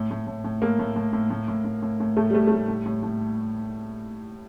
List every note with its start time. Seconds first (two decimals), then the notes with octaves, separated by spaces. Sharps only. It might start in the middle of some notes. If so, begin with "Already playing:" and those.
Already playing: A2
0.11 A2
0.27 A2
0.44 A2
0.62 A2 A#3
0.79 A2
0.96 A2
1.13 A2
1.30 A2
1.48 A2
1.65 A2
1.82 A2
2.00 A2
2.17 A2 A3
2.30 G3
2.34 A2 A3
2.47 A3
2.52 A2 G3
2.68 A2
2.86 A2
3.03 A2